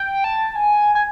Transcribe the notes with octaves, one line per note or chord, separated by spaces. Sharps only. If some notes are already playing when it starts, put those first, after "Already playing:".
Already playing: G5
A5
G#5
G#5